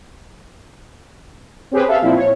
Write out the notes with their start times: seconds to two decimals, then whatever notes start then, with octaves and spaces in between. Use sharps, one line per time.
1.71 C4 C#4 G4 G#4 B4 C5
1.87 A4 E5 F5
2.01 A#2 F3 C4 E4
2.16 C#5